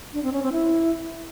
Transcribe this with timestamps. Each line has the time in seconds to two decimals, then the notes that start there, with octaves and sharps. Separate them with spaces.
0.13 D4
0.23 C4
0.33 C#4
0.42 C4
0.52 E4